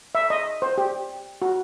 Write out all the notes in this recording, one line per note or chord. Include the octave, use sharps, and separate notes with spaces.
E5
D#5
C5
G4
F#4